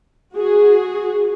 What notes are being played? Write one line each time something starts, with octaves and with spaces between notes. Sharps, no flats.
F#4 G#4